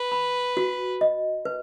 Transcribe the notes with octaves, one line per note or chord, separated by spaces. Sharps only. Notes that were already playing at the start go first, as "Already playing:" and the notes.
Already playing: B4
B5
F#4
D#5
B4